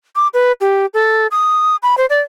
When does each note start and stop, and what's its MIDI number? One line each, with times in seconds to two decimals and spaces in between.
0.16 0.27 86
0.34 0.52 71
0.61 0.86 67
0.94 1.27 69
1.31 1.76 87
1.83 1.95 83
1.98 2.06 72
2.10 2.20 74